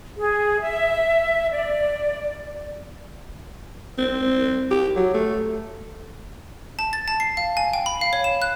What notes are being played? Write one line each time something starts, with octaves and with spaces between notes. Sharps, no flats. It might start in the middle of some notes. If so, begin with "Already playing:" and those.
G#4
E5
D5
C4
G4
F#3
A3
A5
A6
A5
C7
F5
G#5
G5
B5
F5
C#5
E7
F#6